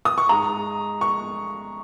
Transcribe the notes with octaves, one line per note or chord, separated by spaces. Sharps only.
D#6
C#6
G#2 G#3 A#5
C#6